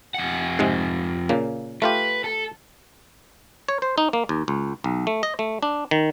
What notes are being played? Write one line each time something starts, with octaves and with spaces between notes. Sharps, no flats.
F2 F#5
G#2 C3 G#3
A#2 C#3 A#3
A3 F4 G4 B4
A4
C#5
C5
D#4
A#3
D#2
C#2
B1
A3
D#5
A3
D4
D#3